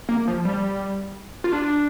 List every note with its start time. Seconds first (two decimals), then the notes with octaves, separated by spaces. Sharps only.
0.09 A#3
0.28 F3
0.45 G3
1.44 F4
1.52 D4